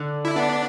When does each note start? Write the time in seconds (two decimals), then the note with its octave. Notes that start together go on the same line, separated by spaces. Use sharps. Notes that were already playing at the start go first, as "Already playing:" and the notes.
Already playing: D3
0.25 E4
0.36 B3 D4